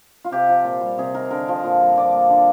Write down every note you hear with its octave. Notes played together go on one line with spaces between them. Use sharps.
F4
C3 G4
F3
A#2
G3
C3 G#4
D#3 A#4
D3 A#4
F3
A#2
G3
F3 D5
A#3
D3